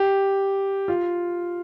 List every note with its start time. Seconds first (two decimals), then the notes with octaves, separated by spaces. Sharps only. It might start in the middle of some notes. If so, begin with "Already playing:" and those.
Already playing: G4
0.88 F4